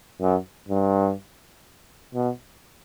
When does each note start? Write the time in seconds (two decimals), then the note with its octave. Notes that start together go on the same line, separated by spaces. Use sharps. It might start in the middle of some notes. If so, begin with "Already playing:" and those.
0.21 F#2
0.69 G2
2.15 B2